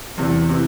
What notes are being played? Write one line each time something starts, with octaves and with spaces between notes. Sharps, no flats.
E2 C3 E3
C3 E3